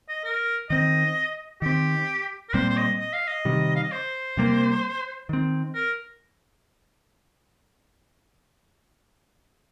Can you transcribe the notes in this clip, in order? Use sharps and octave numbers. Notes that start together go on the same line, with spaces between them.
D#5
A#4
D#3 C4 D#5
D#3 C4 G4
A#4
A#2 G3 C4 C5
C5
D#5
D#5
F5
D#5
C3 D#3 G3
F5
D#5
C5
C3 G3 A#3
D#3 C4
A#4